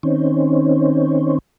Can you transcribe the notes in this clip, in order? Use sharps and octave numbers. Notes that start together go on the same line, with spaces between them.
D#3 C4 C#4